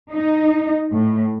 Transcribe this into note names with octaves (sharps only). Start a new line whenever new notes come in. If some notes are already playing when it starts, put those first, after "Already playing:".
D#4
A2